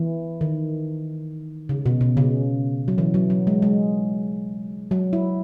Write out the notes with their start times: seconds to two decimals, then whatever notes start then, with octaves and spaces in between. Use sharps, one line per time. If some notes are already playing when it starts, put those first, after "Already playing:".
Already playing: E3
0.41 D#3
1.69 C#3
1.86 B2
2.01 B2
2.17 C#3
2.88 F#3
2.98 E3
3.14 F#3
3.30 F#3
3.47 G#3
3.62 G#3
4.91 F#3
5.13 E4